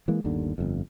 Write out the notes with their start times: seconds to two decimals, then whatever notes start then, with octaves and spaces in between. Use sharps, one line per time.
0.08 E3 G#3 A#3
0.24 G1 D#2 D3
0.58 G1 F2